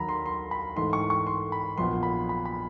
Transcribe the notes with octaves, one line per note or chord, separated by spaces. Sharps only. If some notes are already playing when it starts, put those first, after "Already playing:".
Already playing: D#2 D#3 F#3 A#3 A#5 B5
C6
C6
B5
G#2 E3 A3 C6
C#6
C#6
C6
B5
A#1 A#2 F#3 B3 C6
B5
B5
B5